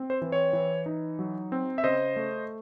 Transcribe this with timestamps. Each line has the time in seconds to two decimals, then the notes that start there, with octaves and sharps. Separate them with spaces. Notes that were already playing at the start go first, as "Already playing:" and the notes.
Already playing: C4
0.10 C5
0.22 E3
0.32 C#5
0.53 E3
0.86 D#4
1.19 F#3
1.52 C4
1.78 E5
1.84 C#3 C5 D#5
2.16 A3